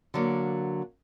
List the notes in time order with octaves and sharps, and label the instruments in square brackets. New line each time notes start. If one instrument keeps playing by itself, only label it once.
[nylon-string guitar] D3 F#3 A#3